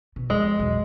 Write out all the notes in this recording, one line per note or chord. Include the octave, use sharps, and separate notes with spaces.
B2
F2 G#3
B1 E2